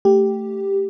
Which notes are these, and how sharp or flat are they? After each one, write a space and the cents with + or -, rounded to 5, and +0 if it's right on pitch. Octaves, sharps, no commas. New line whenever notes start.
A3 +5 G4 +0